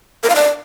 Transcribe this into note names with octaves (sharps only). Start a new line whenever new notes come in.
A#4
F5
D5